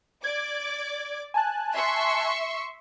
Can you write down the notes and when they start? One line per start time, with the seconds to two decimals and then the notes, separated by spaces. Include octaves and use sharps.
0.24 D5 D6 G#6
1.34 G#5 A5 F#6
1.74 E5 C6 C#6